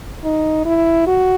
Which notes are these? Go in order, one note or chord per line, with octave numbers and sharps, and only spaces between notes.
D#4
E4
F#4